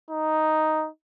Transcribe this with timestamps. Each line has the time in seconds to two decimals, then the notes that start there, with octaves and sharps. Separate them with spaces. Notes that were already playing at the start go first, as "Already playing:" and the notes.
0.11 D#4